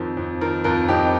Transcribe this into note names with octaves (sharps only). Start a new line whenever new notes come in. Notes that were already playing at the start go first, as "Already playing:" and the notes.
Already playing: F2 D#3 F4 A#4
F2
D#3 F4 A#4
F2 F4 A#4
F2 D#4 G4